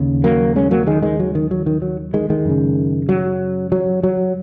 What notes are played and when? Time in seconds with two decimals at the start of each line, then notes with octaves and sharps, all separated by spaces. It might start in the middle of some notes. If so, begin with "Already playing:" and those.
Already playing: D#2 C#3
0.24 F#3 A#3
0.56 G#3 C#4
0.71 F#3 A#3
0.87 D#3 G#3
1.02 D#3 G#3
1.20 F#3
1.35 D#3
1.51 F#3
1.66 D#3
1.82 F#3
2.14 D#3 G#3
2.30 D#3 G#3
2.45 F#2 C#3
3.09 F#3
3.72 F#3
4.03 F#3